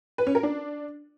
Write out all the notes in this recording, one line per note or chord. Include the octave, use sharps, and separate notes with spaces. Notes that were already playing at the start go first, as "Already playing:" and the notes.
B4
C#4
A#4
D4